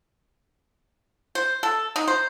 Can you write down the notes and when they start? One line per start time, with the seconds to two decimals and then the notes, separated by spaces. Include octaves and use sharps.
1.35 C5
1.63 A4
1.96 D#4
2.08 C5